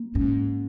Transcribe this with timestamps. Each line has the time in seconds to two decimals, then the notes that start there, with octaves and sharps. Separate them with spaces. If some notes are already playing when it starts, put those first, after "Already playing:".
Already playing: A#3
0.14 G#2 C#4